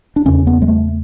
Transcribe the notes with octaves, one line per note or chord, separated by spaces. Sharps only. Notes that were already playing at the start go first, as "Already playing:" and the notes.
D4
E2 C#3 C#4
B3
G#3
A3